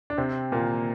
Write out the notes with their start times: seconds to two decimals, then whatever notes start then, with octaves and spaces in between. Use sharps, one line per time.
0.10 D4
0.18 C3 C4
0.52 A#2 A#3